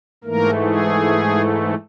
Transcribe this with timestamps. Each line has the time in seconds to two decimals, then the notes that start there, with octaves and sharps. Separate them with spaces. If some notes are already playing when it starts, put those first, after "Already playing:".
0.24 G#2 E3 A3 A#3 A#4
0.63 G#4